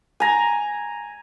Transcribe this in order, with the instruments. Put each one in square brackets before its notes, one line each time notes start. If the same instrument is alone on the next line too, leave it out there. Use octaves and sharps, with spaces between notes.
[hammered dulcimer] G#5 A#5